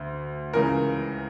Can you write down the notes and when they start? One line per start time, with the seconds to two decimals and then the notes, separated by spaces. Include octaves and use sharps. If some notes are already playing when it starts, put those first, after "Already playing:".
Already playing: D2 D3
0.53 C#2 C#3 E3 A#4